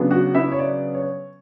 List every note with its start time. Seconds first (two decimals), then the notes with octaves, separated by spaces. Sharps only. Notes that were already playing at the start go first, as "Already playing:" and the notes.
Already playing: C#3 F#3 B3 D4
0.11 F#4 F#5
0.35 E4 E5
0.51 C#5
0.59 D5
0.94 C#5